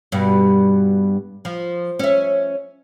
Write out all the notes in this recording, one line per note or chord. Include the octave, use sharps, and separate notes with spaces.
G2 B2
F3
C#4 E5